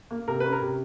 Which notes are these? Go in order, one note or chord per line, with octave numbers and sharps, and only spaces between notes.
A#3
C3 A#4
C#4 B4
A#4
C3